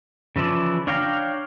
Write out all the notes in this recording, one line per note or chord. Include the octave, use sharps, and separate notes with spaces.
C#3 E3 F3 E4 D5
D4 C#5 F5 G5 A#5